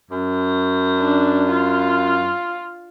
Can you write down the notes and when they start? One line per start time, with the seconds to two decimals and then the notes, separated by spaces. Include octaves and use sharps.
0.11 F#2
0.99 D4
1.51 F4